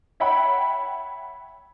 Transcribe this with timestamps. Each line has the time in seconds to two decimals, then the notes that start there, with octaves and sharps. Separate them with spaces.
0.20 C#5 E5 F#5 G5 B5